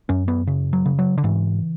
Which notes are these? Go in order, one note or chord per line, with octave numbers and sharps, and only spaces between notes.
F#2 C#4
B3
C#3
F#3
C#3
F#3
D3
G#2 E3